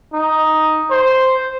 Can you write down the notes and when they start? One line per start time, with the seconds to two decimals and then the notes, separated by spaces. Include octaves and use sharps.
0.14 D#4
0.91 C5